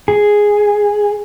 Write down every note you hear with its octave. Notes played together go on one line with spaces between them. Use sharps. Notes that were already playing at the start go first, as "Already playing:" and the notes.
G#4